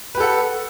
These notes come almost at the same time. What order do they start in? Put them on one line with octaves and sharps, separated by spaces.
B4 G4 A4 F#5